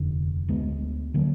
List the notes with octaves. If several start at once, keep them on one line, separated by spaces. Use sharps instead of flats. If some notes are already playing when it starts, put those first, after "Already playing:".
Already playing: F1 D#2 D3
D2 D3 G#3 B3
D3 F#3 A#3